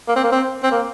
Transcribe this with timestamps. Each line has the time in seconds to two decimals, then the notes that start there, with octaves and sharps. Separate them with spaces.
0.09 A#3
0.16 C4
0.24 A#3
0.32 C4
0.64 C4
0.72 A#3